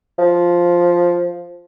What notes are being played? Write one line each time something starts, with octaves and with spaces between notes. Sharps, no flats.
F3